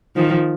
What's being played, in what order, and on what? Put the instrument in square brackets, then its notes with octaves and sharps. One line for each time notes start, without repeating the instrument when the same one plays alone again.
[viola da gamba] D#3 F3